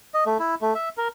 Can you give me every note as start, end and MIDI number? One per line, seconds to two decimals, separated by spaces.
0.14 0.24 75
0.26 0.37 57
0.39 0.55 64
0.61 0.74 57
0.75 0.89 76
0.98 1.08 70